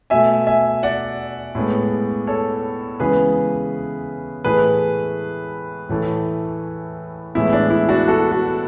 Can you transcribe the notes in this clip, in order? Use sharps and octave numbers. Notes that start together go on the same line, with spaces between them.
B2 A3 E5 G#5
E5 G#5
D5 F#5
A2 G#3 B3
A4 C#5
C#3 E3 G#3 B3 G#4 B4
A2 E3 A3 G#4 B4
A2 E3 A3
A2 E3 G#3 B3 E4
D4
E4
D4 F#4
F#4 A4
F#4 A4